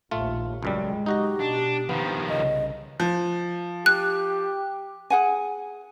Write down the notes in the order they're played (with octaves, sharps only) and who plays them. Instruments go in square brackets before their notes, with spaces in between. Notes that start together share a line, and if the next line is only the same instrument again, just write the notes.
[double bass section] A#1 D#2 [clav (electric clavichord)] A3 F4
[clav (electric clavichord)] C#2 F#2 G3 [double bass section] G#3
[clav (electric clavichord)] D#4 F#4 D#5 [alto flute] G4
[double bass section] B2 [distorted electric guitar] D4
[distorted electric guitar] D#3 F3 [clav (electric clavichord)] B3
[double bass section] C2 C#3 [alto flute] D#5
[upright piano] F3
[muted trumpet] G4 [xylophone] F#6
[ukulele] G#4 F#5 G#5